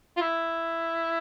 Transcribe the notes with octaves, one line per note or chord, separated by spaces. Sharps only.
F4
E4